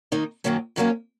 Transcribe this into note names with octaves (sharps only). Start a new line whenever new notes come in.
D#2 D#3 A#3 D#4
F#2 D#3 F#3 A#3 C#4
F#2 D#3 F#3 A#3 C#4